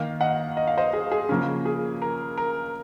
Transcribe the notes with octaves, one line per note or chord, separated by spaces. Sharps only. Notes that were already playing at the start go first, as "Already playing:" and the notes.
Already playing: D#3 A#3 D#4 F5
D#5 F#5
D#5
F5
C5 D#5
G#4
G#4
C#3 F3 A#3 C#4
G#4
A#4
A#4